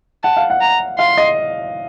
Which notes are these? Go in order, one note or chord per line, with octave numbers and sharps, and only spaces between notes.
F#5 A5
F5
F#5
A#5
F5 C6
D#5